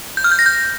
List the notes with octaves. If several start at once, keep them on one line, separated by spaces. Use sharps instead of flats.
G6
F6
G6
A#6
G6